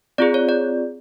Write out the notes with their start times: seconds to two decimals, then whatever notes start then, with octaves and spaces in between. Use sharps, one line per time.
0.18 C4 F4 G#4 D5
0.34 C#5
0.49 D5